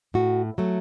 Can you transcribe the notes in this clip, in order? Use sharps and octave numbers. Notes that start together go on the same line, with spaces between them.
A2 F#4
F#3 A3